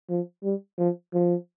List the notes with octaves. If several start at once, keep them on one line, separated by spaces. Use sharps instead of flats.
F3
G3
F3
F3